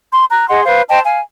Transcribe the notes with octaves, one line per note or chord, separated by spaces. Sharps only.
C6
A#5 F#6
G#4 D#5 F#5 C6
B4 C5 F5
C5 D#5 G5 A5
F5 G#5